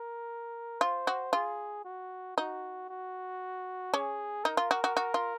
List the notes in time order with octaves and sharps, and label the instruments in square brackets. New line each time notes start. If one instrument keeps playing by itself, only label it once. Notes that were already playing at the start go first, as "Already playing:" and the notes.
Already playing: [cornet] A#4
[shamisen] F4 [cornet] C5
[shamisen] F#4
[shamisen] F4 [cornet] G#4
[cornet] F#4
[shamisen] D#4 [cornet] F#4
[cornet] F#4
[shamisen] C#4 [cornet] G#4
[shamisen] D#4 [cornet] A#4
[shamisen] F4
F#4
F#4
F#4
F4